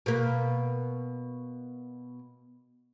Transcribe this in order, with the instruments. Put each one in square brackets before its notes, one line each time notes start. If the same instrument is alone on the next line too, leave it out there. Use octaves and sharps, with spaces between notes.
[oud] B2 A#3